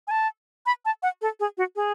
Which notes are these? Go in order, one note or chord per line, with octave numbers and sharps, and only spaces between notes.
G#5
A5
B5
A5
F#5
A4
G#4
F#4
G#4